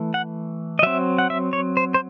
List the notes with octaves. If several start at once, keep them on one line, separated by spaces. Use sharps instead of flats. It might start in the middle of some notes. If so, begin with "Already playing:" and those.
Already playing: E3 A3
F#5
D#5
F#3 C4 E5
F#5
E5
C#5
C5
C5